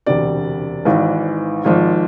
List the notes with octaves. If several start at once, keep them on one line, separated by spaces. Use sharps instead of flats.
E1 D2 C3 D5
G#1 G#2 E3
G#1 G#2 F3